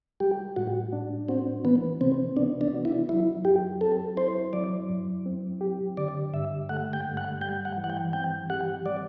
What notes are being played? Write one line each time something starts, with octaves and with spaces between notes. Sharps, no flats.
G3 G4
A2 F#4
D4
C4 F#4
E3 B3
C3 C4
B3 D4
D4
F#4
E4
F#3 E4
F#2 G4
C4 A4
E4 C5
F#3 D5
F#2
C4
G4
D3 D5
G2 E5
A3 F#5
G5
G2
F#5
G3 G5
F#5
E3
F#5
G5
C4 G5
G4 F#5
G3 D5